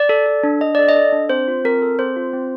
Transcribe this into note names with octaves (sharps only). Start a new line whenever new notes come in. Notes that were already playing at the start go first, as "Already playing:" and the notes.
Already playing: D5
A4
A4
D4
D4 D#5
A4 D5
D#5
A4
D4
C4 C5
F4
C4 A#4
A4
C4 C5
F4
C4